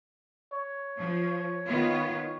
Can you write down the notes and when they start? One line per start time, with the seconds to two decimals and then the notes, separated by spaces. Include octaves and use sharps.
0.53 C#5
0.97 F3
1.66 D#3 B3 F4